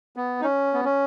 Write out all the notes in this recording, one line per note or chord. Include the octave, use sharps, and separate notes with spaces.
B3
D#4
C#4
B3
C#4